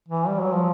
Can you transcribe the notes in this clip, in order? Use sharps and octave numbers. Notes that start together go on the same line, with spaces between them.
E3
G3
F#3
F3